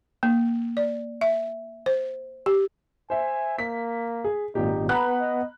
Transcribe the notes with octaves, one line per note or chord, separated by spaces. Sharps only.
A#3
D5
E5
C5
G4
C5 E5 G#5
A#3 B6
G#4
G#1 A#2 D#4 G4
B3 B4 A#5 B5 F#6
D#5